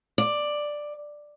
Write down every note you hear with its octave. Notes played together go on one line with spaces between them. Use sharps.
D5